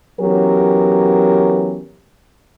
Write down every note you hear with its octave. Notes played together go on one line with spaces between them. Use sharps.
E3 F#3 B3 C#4 G4 A#4